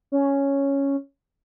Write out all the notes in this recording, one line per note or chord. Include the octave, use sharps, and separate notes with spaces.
C#4